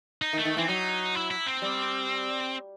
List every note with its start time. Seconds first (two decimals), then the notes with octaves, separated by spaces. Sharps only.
0.22 D#4
0.33 D#3
0.37 A3
0.45 D#3
0.57 E3 C4
0.68 F#3 D#4
1.15 E4
1.31 E4
1.46 C4
1.62 G3